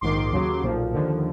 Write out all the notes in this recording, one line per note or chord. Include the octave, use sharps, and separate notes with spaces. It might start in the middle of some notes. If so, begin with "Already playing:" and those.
A#1 G#2 D#3 C6 D6
D#2 C#3 F#3
B1 A#2 F3
D#2 D3 F3